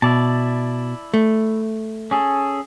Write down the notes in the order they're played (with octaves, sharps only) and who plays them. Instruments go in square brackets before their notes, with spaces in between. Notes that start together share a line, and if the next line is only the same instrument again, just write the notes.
[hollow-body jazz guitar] B2 [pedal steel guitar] E4 D5 A5
[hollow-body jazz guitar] A3
[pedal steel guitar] C#4 G#4 A4